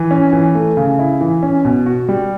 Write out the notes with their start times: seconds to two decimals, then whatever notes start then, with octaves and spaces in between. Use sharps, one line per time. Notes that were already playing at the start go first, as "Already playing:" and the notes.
Already playing: E3
0.11 C#4
0.33 E3
0.55 A3
0.77 C#3
0.99 E4
1.21 E3
1.43 C#4
1.65 B2
1.86 F#4
2.09 G3